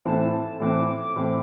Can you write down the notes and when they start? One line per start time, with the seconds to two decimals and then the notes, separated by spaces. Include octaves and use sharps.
0.05 A2 E3 C4 A5
0.33 A5
0.60 A2 E3 C4 D6
0.88 D6
1.16 A2 E3 C4 D6